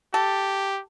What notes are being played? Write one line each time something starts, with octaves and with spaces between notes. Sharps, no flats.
G4 A4